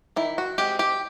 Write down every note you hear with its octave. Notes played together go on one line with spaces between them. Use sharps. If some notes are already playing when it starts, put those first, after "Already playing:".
D#3 E4
F#4
G#3 C4 G4
G4